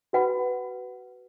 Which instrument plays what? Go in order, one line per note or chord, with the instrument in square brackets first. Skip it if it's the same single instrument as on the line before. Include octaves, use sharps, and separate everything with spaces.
[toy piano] F#4 B4 F#5 B5